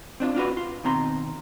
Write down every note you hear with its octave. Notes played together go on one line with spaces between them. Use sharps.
C4 D4 F4
D4 F4 F#4 B4
F4
B2 D#3 C4 A#5 C6